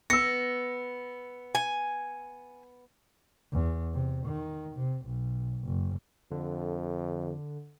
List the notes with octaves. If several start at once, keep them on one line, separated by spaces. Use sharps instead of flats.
B3 E6 A#6 C#7
G#5
E2
C3
D#3
C3
B1
F#1
F2 D3